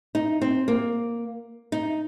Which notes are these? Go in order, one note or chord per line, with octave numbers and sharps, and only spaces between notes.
D#4
C4
A#3
D#4